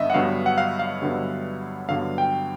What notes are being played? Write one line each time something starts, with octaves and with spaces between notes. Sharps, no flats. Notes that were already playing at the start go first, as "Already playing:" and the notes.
Already playing: G2 D3 F#3 B3 D#5 E5
F#5
G2 D3 F#3 B3 F5
F#5
F5
F5
G2 D3 F#3 B3
G2 D3 F#3 B3 F5
G5